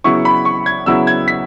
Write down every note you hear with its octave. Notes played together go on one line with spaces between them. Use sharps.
C#3 F#3 B3 E4 C#6
B5
C#6
G#6
C#3 F#3 B3 E4 E6
G#6
B6